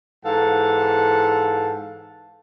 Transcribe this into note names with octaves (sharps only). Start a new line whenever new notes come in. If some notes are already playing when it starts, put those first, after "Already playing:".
G#2 E3 A4 F5 F#5